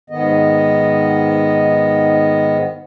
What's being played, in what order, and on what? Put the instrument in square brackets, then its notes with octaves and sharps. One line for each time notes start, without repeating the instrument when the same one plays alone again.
[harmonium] G#2 D#3 B3 D#5